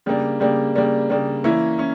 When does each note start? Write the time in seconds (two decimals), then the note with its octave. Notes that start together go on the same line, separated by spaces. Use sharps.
0.06 C#3 G3 A#3 D4
0.40 C#3 G3 A#3 D4
0.75 C#3 G3 A#3 D4
1.10 C#3 G3 A#3 D4
1.44 E3 A#3 C#4 E4
1.78 C#4 E4